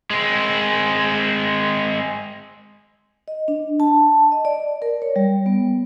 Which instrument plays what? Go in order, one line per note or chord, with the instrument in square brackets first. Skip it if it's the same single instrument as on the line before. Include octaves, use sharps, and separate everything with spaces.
[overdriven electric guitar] G#3 C4
[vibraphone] D#5
D4
A5
D#5
D5
A#4
C#5
G3
B3